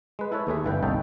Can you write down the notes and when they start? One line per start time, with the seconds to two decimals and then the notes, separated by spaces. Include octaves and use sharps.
0.19 G#3 B4
0.32 E4 A4 B4 C#5
0.47 D#2 A3 G#4 E5
0.64 G1 E3 B4 G5
0.83 G1 C2 C#4 D#4 A4 G5